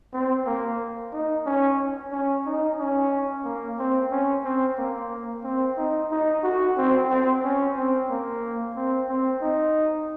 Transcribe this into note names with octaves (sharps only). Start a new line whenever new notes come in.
C4
A#3
D#4
C#4
C#4
D#4
C#4
A#3
C4
C#4
C4
A#3
C4
D#4
D#4
F#4
C4
C4
C#4
C4
A#3
C4
C4
D#4